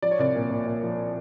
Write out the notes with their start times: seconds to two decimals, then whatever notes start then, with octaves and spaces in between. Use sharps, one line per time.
0.02 F3 D5
0.11 C#5
0.19 C2 D5
0.35 A#2
0.50 A#2
0.66 A#2
0.83 F3